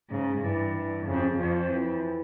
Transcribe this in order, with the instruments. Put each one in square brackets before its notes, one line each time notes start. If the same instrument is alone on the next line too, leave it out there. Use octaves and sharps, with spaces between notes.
[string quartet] G#2 [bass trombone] C#3
[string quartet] G2 [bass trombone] E3
[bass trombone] E3
[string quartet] F2 [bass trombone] C#3
[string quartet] F2 [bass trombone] F3
[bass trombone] E3